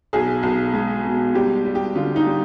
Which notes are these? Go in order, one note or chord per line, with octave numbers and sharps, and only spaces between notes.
B1 G#4
B1
G#3
B2
G3 G4
G3
G4
D3 F4
D#4
G3